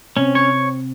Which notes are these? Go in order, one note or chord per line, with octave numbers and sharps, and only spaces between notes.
C3 C4 C#4
C#5